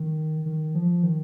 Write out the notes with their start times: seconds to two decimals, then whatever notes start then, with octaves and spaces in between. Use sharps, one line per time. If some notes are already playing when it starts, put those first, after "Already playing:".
Already playing: D#3
0.45 D#3
0.75 F3
1.03 D#3